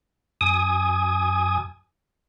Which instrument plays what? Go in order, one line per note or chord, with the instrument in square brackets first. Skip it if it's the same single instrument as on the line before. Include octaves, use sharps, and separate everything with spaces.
[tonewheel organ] F#2 G#5 D#6